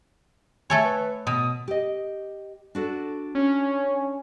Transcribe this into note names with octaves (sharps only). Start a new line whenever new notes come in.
A3 A4 C#5 G#5
B4
B2 D#6
G4 D#5
D4 F#4 A4
C#4